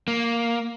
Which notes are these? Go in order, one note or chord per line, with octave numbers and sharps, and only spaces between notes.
A#3